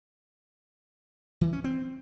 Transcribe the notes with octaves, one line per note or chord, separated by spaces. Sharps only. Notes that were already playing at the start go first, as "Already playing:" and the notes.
E3
C#4
C4